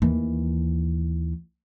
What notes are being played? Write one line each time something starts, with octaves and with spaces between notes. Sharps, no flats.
D#2 E3